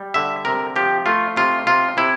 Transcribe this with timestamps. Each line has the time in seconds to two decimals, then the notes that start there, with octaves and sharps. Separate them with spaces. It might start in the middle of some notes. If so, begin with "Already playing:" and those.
Already playing: G3
0.14 D3 E5
0.45 C3 A#4
0.76 F3 G4
1.06 A3 F4
1.36 C3 F4
1.67 C3 F4
1.97 C3 E4